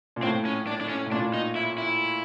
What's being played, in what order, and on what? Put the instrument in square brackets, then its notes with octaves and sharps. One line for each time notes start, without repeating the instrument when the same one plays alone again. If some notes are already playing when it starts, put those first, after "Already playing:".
[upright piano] A#2
[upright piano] A2 [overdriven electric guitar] C4
[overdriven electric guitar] C#4
D4
D4
C#4
[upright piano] A2
[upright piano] A#2 [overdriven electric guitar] D4
[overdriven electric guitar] D#4
E4
E4